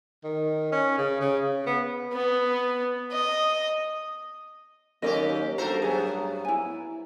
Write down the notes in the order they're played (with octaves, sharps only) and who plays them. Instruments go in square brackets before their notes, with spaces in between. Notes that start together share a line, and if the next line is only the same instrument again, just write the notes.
[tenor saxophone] D#3
C#4
C#3
C#3
C#3
B3
[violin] B3
D#5
[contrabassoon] D#2 [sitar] F#3 C#4 G4 [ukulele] D#4 A#4 D#5
[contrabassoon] G2 [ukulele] F#4 G4 [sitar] A4 A#4 C5
[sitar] A2 F#3 B3 [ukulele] G#4
[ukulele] E4 G#5